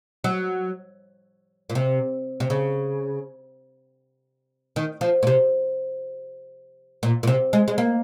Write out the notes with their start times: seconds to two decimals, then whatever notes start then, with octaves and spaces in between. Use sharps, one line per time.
0.24 F#3
1.70 A#2
1.75 C3
2.40 C3
2.50 C#3
4.76 D#3
5.01 F3
5.23 A#2
5.27 C3
7.03 A#2
7.23 A#2
7.27 C3
7.53 G#3
7.68 G#3
7.78 A#3